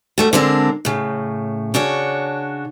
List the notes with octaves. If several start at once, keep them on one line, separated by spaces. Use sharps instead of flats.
G3 A3 F#4
D3 G#3 C4 D4 A#4
A2 C#3
C#3 D4 F#4 C#5